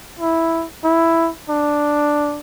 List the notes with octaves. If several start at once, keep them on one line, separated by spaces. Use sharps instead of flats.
E4
E4
D4